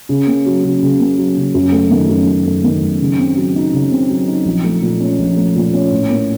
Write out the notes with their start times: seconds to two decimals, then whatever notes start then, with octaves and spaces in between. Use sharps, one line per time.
0.09 C#3
0.27 A#3
0.46 F#3
0.64 C#3
0.82 C#3
0.99 A#3
1.18 F#3
1.36 C#3
1.54 F#2
1.72 A3
1.91 D#3
2.09 F#2
2.27 F#2
2.46 A3
2.64 D#3
2.81 F#2
3.01 C#3
3.18 C4
3.37 F#3
3.55 D#4
3.73 C#3
3.91 C4
4.09 F#3
4.28 D#4
4.45 A#1
4.64 A3
4.82 A#2
5.00 C#4
5.19 A#1
5.37 A3
5.55 A#2
5.73 C#4
5.91 A2
6.09 A#3